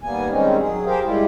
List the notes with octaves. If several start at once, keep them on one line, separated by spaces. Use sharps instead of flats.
D#2 G3 A#3 B3 G#5
D#3 G3 G#3 C4 C#4 D#4
F#3 G#4
G4 G#4 A#4 C5 F5 G5
G3 G#3 E4 F4 G4